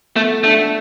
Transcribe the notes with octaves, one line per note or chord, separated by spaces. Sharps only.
A3 B3 F4 A4
A3 D4 A4 E5